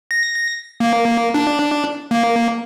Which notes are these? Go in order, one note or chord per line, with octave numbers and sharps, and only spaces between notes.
A#6
A#3
D4
A#3